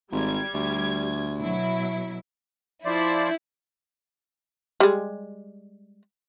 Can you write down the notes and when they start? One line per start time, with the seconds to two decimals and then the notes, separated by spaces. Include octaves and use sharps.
0.12 G#1 G3 G#6
0.54 D2
1.40 B2 F#3 E4
2.85 F3 E4 C5 D5
4.80 G3 G#3